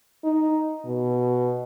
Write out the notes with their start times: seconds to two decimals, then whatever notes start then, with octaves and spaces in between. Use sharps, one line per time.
0.24 D#4
0.85 B2